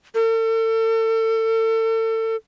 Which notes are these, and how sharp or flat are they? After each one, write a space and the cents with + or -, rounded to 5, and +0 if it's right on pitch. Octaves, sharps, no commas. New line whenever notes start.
A4 +35